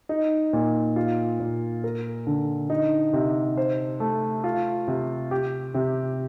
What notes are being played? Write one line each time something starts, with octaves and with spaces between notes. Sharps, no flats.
D#4
A#2
F4
A#2
A#4
D3
D#4
C3
C5
A3
F4
C3
G4
C3